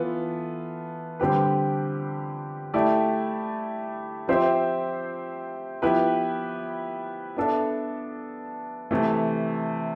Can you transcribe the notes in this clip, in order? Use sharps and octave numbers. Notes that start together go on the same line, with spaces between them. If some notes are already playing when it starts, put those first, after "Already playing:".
Already playing: E3 B3 F4 A4
D3 G3 C4 G4 B4
A3 E4 G4 D5
F3 C4 G4 C5 E5
F3 B3 E4 G4 B4
B3 D4 A4 E5
C3 E3 A3